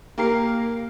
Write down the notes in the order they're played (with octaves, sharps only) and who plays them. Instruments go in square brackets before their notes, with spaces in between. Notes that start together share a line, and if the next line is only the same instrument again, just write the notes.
[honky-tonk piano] A#3 G4 A#4 C7